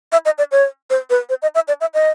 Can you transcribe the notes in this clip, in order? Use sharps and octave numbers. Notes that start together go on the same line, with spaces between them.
E5
D#5
D5
C#5
C5
B4
C5
D#5
E5
D5
E5
D#5